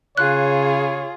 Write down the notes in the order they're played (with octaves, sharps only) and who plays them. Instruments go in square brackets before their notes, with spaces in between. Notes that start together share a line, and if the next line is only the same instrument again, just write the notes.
[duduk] C#3 [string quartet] F4 G#4 [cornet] C#5 [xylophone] F#6